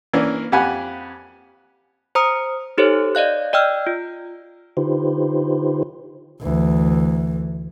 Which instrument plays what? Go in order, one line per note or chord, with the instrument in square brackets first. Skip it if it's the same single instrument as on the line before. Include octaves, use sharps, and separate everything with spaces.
[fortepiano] E3 A#3 C#4 D4
F2 G4 F#5 G#5 B5
[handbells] C5 A#5 D#6 C#7
D#4 G4 A4 C5 C#5
D5 D#5 F5 F#6
D5 D#5 G5 E6 F6
F4
[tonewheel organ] D3 D#4 F4 G4 B4 C5
[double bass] D2 E3